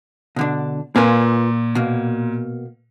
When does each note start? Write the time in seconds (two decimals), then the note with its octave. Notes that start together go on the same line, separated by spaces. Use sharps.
0.36 B2 D3 D4
0.96 A#2 F4 B4 G#5
1.75 B2 A#3